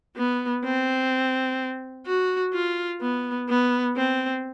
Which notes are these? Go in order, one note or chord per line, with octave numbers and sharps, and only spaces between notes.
B3
C4
F#4
F4
B3
B3
C4